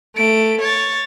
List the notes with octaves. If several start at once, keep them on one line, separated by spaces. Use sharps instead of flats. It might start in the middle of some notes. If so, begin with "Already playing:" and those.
A3 D7
C#5 A6